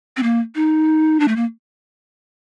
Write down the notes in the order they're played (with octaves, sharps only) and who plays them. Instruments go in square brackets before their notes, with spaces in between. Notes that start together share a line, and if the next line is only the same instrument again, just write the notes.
[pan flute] C4
A#3
D#4
D4
A3
A#3